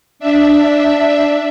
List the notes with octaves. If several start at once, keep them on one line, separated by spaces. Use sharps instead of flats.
D4 E5